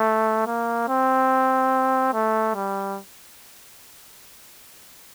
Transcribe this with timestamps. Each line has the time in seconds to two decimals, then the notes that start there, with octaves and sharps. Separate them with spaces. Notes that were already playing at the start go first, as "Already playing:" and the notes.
Already playing: A3
0.47 A#3
0.89 C4
2.14 A3
2.55 G3